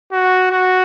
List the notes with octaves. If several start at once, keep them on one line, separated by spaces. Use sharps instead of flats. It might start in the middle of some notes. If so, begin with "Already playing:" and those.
F#4
F#4